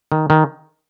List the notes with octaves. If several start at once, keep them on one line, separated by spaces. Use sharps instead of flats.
D#3
D#3